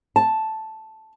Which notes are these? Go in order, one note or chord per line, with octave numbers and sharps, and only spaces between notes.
A5